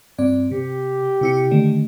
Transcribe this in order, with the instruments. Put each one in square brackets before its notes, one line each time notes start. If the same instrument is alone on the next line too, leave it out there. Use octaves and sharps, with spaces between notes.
[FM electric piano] G2 C4 D5
[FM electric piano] C3 [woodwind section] G4
[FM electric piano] C3 E4 C#7
D3 D#3 A3